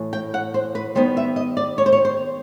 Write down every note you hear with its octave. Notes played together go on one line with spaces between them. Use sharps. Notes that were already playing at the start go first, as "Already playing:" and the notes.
Already playing: A2 E3
G5
F#5
C5
B4
D#3 G3 B3 C5
E5
D#5
D5
C#5
C5
C#5
C5